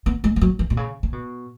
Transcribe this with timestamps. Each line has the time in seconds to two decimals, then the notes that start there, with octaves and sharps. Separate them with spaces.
0.06 B3
0.24 G#3
0.36 G#3
0.41 F#3
0.59 E3
0.70 B2
0.77 C#3
1.03 C#3
1.13 B2